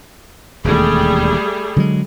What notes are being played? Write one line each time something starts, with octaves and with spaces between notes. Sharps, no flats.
E1 D#2 G3 A3 G#4
D3 F#3 G#3